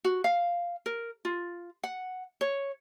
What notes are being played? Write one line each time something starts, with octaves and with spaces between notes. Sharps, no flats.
F#4
F5
A#4
F4
F#5
C#5